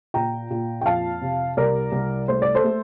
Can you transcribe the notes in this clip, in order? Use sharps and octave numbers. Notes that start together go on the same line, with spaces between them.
A#2 G5 A#5
A#2
G5
F2 F5 A5
C3
C2 A#4 D5
C2
A3 C5
D5
A4 C5
A3